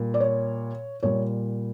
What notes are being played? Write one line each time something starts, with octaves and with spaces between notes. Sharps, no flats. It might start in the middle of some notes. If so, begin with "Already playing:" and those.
Already playing: A#2 G3
D5
C#5
A#2 G3 C#5